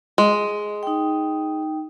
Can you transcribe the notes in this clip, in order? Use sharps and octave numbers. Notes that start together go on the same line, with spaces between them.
G#3
D#4 G5